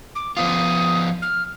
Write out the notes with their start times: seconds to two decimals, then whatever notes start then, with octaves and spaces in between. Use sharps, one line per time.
0.15 D6
0.37 F3 B3 F4 D#6
1.22 F6